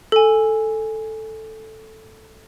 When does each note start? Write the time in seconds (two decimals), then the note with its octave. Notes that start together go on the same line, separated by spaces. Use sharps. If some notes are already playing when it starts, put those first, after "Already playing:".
0.12 A4 G#5